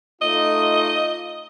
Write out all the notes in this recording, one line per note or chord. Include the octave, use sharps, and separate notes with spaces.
A3 D#4 F4 D#5